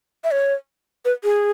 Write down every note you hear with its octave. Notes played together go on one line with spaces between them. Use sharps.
E5
C#5
B4
G#4